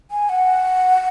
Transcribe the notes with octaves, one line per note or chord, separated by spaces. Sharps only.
G#5
F#5